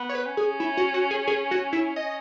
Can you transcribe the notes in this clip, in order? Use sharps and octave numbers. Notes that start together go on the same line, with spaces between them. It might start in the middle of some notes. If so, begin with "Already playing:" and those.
Already playing: B3
C#5
B4
C#4
G#4
E4
F#4
F#4
G#4
G#4
F#4
E4
C#4 D#5